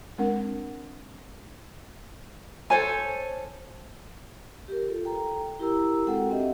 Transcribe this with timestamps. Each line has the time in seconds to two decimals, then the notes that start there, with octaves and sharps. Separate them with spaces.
0.18 G#3 C4 D4 A#4 F#5
2.70 A4 C5 C#5 G#5
4.68 G4 A#4
4.88 F4 A4
5.04 A4 G5 A#5
5.59 E4 G4 A#4 A#5 E6
6.07 G#3 C4 F#4 A4 F#5 G5
6.30 C4 D4 G4 D#5 E5